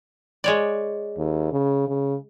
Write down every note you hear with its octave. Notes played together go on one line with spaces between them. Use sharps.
G#3 C#5 D5
D#2
C#3
C#3